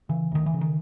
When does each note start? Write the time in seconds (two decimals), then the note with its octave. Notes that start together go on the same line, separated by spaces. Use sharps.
0.09 C#3 E3
0.32 D2 D#3
0.46 E3
0.54 C#3
0.61 D#3